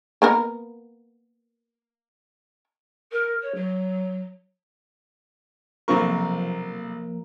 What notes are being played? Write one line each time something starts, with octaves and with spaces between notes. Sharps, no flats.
A#3 B3 A#4
A#4
C#5
F#3
B1 C3 F3 A#3 A#4 C#6